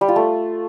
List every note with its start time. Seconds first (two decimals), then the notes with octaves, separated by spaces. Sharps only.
0.01 G3
0.08 F4
0.16 A3